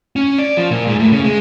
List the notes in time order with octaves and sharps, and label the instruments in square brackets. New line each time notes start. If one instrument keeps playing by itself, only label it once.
[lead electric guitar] C#4
D5
F3
A#2
G#2
A2
C#3
G#3